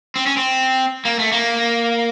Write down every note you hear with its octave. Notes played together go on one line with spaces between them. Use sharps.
C4
C#4
C4
A#3
A3
A#3